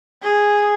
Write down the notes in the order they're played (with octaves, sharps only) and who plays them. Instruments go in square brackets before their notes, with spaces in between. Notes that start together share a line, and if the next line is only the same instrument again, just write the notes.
[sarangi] G#4